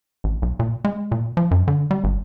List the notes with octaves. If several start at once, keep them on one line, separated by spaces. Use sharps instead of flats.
A1
B1
A#2
G#3
A#2
F3
F#2
D3
G3
G#1